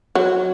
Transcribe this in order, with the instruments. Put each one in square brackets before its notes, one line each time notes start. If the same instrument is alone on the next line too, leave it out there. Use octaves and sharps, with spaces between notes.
[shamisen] F#3